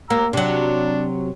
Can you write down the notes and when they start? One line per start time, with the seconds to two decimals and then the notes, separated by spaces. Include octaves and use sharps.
0.10 A#3 A#5 E6
0.33 C3 F#3 D4